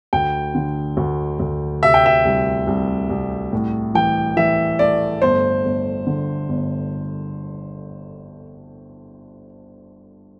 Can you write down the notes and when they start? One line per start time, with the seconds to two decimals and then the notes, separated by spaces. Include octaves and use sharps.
0.13 D2 G5
0.55 D3
0.97 D2
1.39 D2
1.83 C3 E5
1.94 G5
2.06 E5
2.25 C2
2.67 C2
3.10 C2
3.53 A2
3.95 E3 G5
4.37 E3 E5
4.79 A3 D5
5.22 G1 C5
5.65 G1
6.07 D3
6.49 G1